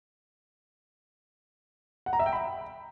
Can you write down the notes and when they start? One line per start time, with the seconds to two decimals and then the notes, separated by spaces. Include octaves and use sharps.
2.06 F#5
2.13 A#5
2.19 E5
2.26 G5
2.33 B5